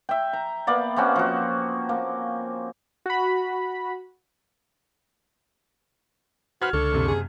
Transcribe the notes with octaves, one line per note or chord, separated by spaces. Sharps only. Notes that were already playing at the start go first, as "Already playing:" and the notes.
E5 G5
A#5
A#3 B3 D5
A#3 C4 C#4 F#4
F3 F#4
A#3
F#4 B5
F#4 B4 C5 F#5 F6 G#6
C#2 D3 A4 C#6
F#1 C3
G#4